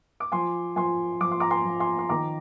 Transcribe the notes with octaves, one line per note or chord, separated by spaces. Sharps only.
D6
F3 G#5 C6
F3 G#5 C6
F3 D6
C6
A#5 D6
G#5 C6
F3
G#5 C6
C6
D#3 A#5 D6